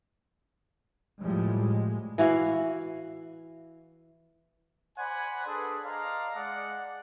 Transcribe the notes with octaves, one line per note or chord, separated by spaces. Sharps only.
A2 F3 G3 G#3
G#3
E3 E4 F#4 F5
C5 D5 F#5 G#5 B5 C6
D4 G#4 A4 B4
D5 D#5 F5 A5 A#5 C6
G#3 D5 F#5